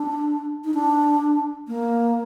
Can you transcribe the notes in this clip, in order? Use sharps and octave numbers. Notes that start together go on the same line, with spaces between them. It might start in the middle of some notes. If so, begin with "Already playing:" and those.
Already playing: D4
D#4
D4
A#3